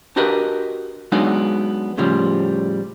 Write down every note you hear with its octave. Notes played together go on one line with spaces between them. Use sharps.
D4 F#4 G4 A#4 B4 D#5
F#3 G#3 B3 D4 D#4 F#4
A2 C#3 F3 G3